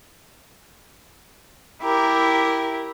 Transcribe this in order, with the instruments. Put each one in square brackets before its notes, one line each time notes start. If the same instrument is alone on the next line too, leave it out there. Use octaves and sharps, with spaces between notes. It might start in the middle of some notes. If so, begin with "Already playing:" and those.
[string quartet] E4 G4 A#4